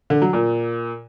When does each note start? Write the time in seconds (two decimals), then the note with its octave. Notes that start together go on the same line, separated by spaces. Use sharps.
0.10 D3
0.22 F#3
0.33 A#2